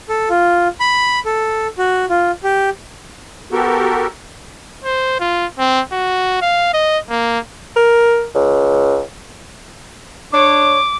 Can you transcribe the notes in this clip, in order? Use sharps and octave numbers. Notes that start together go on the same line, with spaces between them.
A4
F4
B5
A4
F#4
F4
G4
B3 F#4 G4 A4 A#4
C5
F4
C4
F#4
F5
D#5
A#3
A#4
C#2
D4 C#5 D6